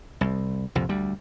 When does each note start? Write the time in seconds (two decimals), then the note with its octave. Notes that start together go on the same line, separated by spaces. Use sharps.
0.21 C2
0.75 C2 F2 A#2
0.89 D2 G3